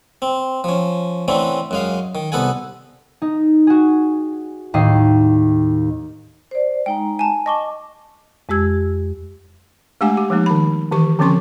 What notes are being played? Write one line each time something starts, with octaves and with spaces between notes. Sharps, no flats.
C4
F3 C#4
D3 E3 A3 C4 C#4
F#2 G#3 F5
D#3
C2 B3 A4 F#5 G#5
D#4
F#4 G#4
D#2 A2 D#5 C7
C5 D5
G#3 D#4 G5 A#5
G#5 A5
D#5 A5 C#6 D6 G7
F2 G#3 G4 E6 G#6
G#3 A3 D4 G4 F#5 G#5
G4
F3 G#3 A#3 D#4
D#3 B5
D#3 E3 G4 C#6
D3 F3 C4 C#4 C6 C#6